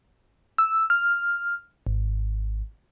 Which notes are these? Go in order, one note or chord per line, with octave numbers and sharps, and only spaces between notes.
E6
F6
G#1